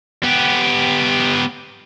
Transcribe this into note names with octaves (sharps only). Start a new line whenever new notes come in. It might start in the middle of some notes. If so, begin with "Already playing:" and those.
B3 G4